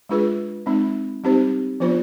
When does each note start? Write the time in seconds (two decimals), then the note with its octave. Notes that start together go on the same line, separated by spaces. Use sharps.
0.09 G#3 D4 F4 G#4 B4
0.66 G#3 C4 D#4
1.24 G3 C4 D#4 G4 C5
1.80 F3 B3 D4 F4 C5